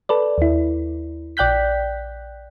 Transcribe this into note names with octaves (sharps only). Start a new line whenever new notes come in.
A4 B4 D5
D#2 E4
A#1 D5 G5 F#6 G6 B6